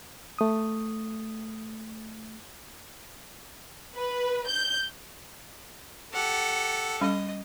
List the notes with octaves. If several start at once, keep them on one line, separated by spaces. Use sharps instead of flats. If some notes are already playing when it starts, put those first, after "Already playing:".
A3 D#6
B4
G6
G4 A4 F#5
G3 C#4 D#5